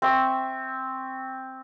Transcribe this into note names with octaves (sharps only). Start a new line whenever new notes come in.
C4 E5 C#6